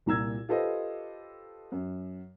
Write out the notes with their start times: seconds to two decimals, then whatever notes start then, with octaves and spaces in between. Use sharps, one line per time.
0.06 C2 A#2 A#5 E6 G#6
0.49 F4 G4 A4 B4 C5 D#5
1.72 F#2